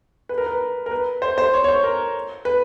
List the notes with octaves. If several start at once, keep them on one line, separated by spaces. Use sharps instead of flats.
B4
A#4
B4
A#4
B4
C5
C5
C#5
C#5
C5
A#4
B4